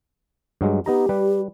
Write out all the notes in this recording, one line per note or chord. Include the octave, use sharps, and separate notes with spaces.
G2 F#3 G#3
B3 D#4 G4 A#5
G3 B4